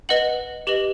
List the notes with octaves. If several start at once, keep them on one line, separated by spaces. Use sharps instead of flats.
B4 D#5 F#5 F#7
G4 B4 D#5 F#7